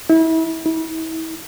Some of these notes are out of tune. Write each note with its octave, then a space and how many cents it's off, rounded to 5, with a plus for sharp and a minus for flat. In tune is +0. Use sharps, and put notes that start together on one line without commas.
E4 -30
E4 -35